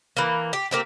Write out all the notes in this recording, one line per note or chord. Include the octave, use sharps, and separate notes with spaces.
E3 A#3
G4
A#3 C4 G4